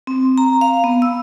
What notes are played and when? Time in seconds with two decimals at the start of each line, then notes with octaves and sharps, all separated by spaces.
0.07 C4
0.38 A#5
0.61 F5
0.84 B3
1.02 E6